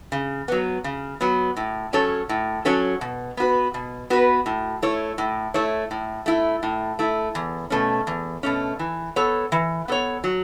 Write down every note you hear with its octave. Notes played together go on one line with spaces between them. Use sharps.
C#3
F#3 B3
C#3
F#3 B3
A2
F#3 C#4 A4 C#5
A2
F#3 C#4 A4 C#5
B2
B3 F#4 B4
B2
B3 F#4 B4
A2
A3 E4 C#5
A2
A3 E4 C#5
A2
A3 E4
A2
A3 E4
E2
B2 A3 C#4
E2
B2 A3 C#4
E3
B3 A4 C#5
E3
B3 A4 C#5
F#3